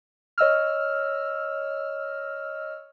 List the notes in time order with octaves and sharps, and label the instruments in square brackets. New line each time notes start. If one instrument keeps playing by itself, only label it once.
[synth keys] C#5 D#5 E6 F6